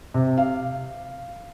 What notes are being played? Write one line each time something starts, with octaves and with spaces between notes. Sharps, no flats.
C3
F5